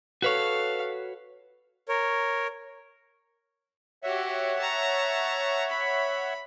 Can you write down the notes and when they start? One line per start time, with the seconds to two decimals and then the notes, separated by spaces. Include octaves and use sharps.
0.22 F#4 A4 B4 C#5 F5
1.89 A#4 C#5
4.03 F#4 G4 C#5 E5 F#5
4.59 A5 A#5
5.69 B5